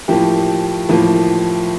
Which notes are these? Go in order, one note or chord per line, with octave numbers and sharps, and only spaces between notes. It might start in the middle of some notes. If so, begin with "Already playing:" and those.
A2 F3 A#3 G4
A2 F3 A#3